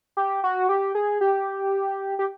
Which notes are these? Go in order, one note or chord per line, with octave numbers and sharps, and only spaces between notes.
G4
F#4
G4
G#4
G4
G4